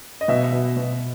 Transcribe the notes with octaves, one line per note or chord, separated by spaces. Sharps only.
D#5
B2 E5
B2
B2